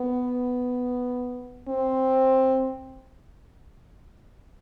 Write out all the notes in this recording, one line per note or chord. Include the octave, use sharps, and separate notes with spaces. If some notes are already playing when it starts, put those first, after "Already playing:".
Already playing: B3
C4